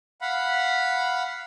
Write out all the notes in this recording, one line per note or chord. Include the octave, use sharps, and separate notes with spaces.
F5 F#5 B5